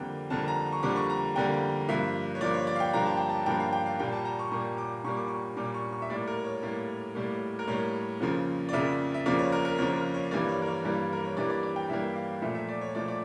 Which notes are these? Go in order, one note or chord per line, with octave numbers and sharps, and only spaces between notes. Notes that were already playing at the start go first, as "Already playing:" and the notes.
Already playing: F2 D3 G3 A#3 G5
F2 D3 G3 A#3 A5
A#5
C#6
F2 D3 G3 A#3 D6
C#6
A#5
F2 D3 G3 A#3 G5
G2 F3 A#3 E5
C#5
G2 F3 A#3 D5
C#5
D5
F5
G5
G2 F3 A#3 A#5
A5
G5
A5
G2 F3 A#3 G5
F5
G5
F5
A#2 G3 A#3 G5
A5
A#5
C#6
A#2 G3 A#3 C#6
D6
A#2 G3 A#3 C#6
D6
C#6
A#2 G3 A#3 D6
C#6
C#6
E5
A2 G3 A#3 D5
A#4
C#5
A2 G3 A#3
A2 G3 A#3
A#4
A2 G3 A#3 C#5
F2 C#3 F3 A#3
D5
F2 C#3 F3 A#3 E5
E5
F2 C#3 F3 A#3 D5
C#5
A#4
A#4
F2 C#3 F3 A#3 C#5
A#4
C#5
G2 E3 G3 A#3 D5
C#5
A#4
C#5
G2 E3 G3 A#3
A#4
C#5
G2 E3 G3 A#3 D5
D5
D5
G5
G2 E3 G3 A#3 E5
F5
A#2 F3 A3 E5
E5
D5
C#5
A#2 F3 A3 D5
D5